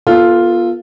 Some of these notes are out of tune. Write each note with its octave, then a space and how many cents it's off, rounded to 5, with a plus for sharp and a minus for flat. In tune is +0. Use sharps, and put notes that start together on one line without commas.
B3 -40 F4 +0 A4 +0